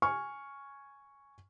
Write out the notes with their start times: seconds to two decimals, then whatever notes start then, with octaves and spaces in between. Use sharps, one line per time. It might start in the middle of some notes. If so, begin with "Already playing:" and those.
0.02 G#5 C#6 F6